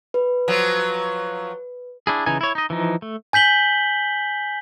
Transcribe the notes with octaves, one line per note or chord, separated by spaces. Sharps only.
B4
F3 F#3
D4 E4 G#4
C#3 E3 D#4 G#5
E4 C#5
D#4 D#5
E3 F3 D#4
A3
G#5 G6 B6 F#7 G7